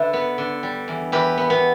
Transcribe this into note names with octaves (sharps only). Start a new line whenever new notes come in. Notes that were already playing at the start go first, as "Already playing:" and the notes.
Already playing: D3 B4 E5
B3
D3
G3
E2
E2 G4 B4
B3
B3